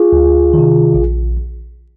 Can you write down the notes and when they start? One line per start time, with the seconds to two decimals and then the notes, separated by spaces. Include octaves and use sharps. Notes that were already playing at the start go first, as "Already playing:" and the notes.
Already playing: F4 G#4
0.13 D2
0.54 D#3
0.59 C3
0.95 A#1